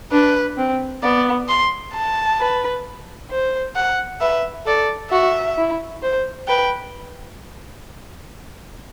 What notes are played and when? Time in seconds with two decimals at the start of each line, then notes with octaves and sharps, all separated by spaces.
0.12 D4 B4
0.57 C4
1.03 B3 D5
1.48 C6
1.94 A5
2.39 B4
3.30 C5
3.75 F#5
4.21 B4 E5
4.66 A4 D5
5.11 F#4 E5
5.58 E4
6.02 C5
6.48 B4 G5